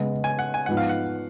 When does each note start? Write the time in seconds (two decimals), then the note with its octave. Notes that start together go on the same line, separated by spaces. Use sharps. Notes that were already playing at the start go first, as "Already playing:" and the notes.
Already playing: C#3 G#3 B3
0.24 G#5
0.39 F#5
0.54 G#5
0.66 G#2 F3 B3 F#5
0.77 F5
0.89 F#5